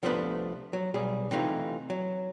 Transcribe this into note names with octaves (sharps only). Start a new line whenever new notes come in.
C2 F3 A3 B3 D4 B4
F#3
B1 G3 G#4
C3 E3 A3 D#4 F4
F#3